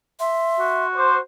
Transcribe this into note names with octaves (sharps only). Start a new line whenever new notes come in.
E5 C6
F#4
C5 D6